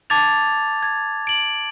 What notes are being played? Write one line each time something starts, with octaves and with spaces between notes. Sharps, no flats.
A5 D6 G#6 A6 F7
G#6
D7 F#7